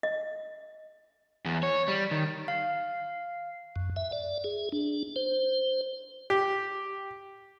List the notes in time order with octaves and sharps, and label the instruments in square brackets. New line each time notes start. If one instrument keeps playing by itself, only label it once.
[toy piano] D#5
[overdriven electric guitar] E2
C#5
G3
D#3
[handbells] F5
[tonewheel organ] F#2
E5
D5
G#4
D4
C5
[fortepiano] G4